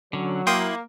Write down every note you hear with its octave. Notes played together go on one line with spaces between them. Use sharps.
D3 F#3 C#4
A#3 E4 G5 C6 D#6